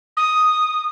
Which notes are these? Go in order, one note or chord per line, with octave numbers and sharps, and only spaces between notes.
D#6